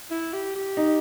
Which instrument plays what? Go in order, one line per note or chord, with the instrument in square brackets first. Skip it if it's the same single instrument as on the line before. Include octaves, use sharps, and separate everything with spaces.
[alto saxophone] E4
G4
G4
[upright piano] D#4